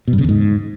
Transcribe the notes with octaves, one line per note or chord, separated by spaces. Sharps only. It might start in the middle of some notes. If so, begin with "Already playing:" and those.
B2
G2
C#3
E2
G#2